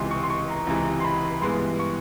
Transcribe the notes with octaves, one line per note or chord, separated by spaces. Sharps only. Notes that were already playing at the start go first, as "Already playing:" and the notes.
Already playing: C#2 C3 E3 C6
C#6
C6
C#6
A#5
C#2 C3 E3 A#5
C6
B5
G2 E3 G#3 B3 C6
C#6